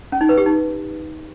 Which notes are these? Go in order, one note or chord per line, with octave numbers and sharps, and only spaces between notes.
C#4
D#4
B4
G4
D#4